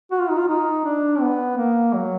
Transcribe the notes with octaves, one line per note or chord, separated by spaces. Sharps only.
F#4
F4
D#4
F4
D#4
D4
B3
A#3
F#3